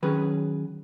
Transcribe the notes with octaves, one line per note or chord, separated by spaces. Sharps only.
D#3 F#3 C#4 G#4 B4